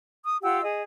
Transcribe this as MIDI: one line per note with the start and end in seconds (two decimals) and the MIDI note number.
0.24 0.36 87
0.42 0.60 65
0.42 0.60 67
0.42 0.60 78
0.42 0.60 88
0.62 0.81 68
0.62 0.81 75